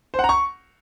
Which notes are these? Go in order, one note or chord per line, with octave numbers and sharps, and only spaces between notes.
C5
F#5
A#5
C#6